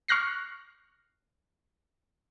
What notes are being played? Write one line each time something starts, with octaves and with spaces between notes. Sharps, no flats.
C#6 F6 F#6 A#6 C7